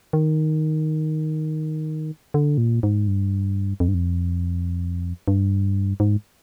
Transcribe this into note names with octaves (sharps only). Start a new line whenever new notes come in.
D#3
D3
A#2
G#2
G2
F2
G2
F2
G2
G#2